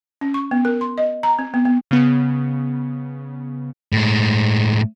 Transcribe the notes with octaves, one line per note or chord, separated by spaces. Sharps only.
C#4
C#6
B3
A#4
C6
D#5
A#5
C4
B3
B3
C#3 B3
A2 G#3